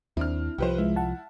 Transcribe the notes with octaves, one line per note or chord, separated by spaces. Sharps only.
D#2 C4 D4 E4 F6
C2 F3 G4 B4 C5
G#3 E4
F#5 A5